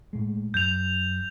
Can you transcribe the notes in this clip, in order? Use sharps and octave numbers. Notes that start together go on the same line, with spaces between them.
A2 G#3
F#2 G6 F7